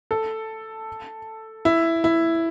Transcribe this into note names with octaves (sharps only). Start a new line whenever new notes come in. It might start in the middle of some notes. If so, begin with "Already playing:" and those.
A4
E4
E4